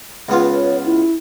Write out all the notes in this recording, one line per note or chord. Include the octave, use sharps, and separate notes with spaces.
C#2 B3 F4
C#5
E4